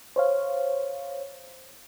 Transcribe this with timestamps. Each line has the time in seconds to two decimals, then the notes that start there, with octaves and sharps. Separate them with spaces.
0.16 C5 C#5 F5